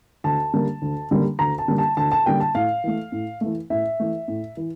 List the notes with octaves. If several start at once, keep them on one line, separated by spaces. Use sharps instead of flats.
D2 A5
D3 G3 A#3
D2
D3 G3 A#3
D2 A#5
A5
D3 G3 A#3
A5
D2 A5
A5
D3 G3 A#3 G5
A5
A2 F5
E3 A3
A2
E3 A3
A2 E5
E3 A3
A2
E3